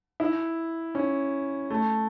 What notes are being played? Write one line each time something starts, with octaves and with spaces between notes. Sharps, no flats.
E4
C#4
A3